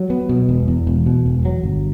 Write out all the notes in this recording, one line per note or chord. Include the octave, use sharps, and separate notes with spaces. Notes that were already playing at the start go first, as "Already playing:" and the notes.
Already playing: F#3
B3
B2
E1
E2
E1
B2
E1
F#3
G1